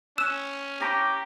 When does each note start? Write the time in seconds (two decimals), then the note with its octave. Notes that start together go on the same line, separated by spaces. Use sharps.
0.18 C#4 E6 F#6 E7
0.81 G4 A#5 C#6 D6